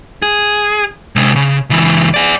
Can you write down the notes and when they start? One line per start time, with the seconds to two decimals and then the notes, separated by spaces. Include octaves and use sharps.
0.22 G#4
1.16 C3 G#3
1.36 C#3
1.70 C#2 E3
2.14 G#4 D5